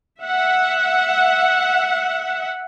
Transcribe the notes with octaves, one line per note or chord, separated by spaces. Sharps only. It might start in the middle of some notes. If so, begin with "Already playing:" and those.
E5 F#5